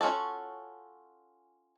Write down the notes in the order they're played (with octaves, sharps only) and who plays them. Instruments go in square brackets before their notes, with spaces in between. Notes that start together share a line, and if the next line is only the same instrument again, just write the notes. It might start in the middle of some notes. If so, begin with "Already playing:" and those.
[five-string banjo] C#4 F4 F#4 A4